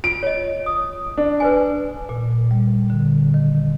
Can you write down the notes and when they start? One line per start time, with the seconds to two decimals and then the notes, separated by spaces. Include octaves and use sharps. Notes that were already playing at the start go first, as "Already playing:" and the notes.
0.04 F4 D7
0.23 C#5 D#5
0.66 D#6
1.18 D4
1.40 B4 C5 G#5
2.09 A#2
2.51 G3
2.90 D3
3.34 D#3